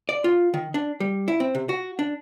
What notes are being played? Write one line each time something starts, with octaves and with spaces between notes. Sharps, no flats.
D5
F4
D#3
D4
G3
E4
C4
C3
F#4
D4